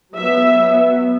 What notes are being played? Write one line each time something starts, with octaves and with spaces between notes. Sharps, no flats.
F#3 B3 E5
F#3 B3